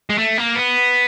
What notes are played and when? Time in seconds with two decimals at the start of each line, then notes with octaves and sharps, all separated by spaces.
0.10 G#3
0.18 A3
0.37 A#3
0.55 B3